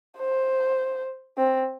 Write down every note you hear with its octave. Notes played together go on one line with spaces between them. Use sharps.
C5
C4